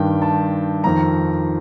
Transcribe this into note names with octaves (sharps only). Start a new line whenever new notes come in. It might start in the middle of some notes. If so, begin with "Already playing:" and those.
Already playing: G2 D#3 G5
A5
F2 D#3 A#5